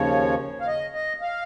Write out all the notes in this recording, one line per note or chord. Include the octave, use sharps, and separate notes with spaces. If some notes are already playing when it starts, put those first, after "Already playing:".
Already playing: D#2 C#3 F3 C#5
F5
D#5
D#5
F5